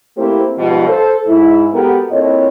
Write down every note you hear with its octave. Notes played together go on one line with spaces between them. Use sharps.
A3 A#3 C4 E4 G4 C5
G#2 B2 F3 G3 D#4 F4
A4 C5
G#2 E4
G#3 B3 F#4 G4 A4 A#4
A#2 C4 E4 A4 C#5 D#5